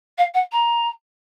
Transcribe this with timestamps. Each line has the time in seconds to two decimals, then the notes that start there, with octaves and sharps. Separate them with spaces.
0.18 F5
0.34 F#5
0.52 A#5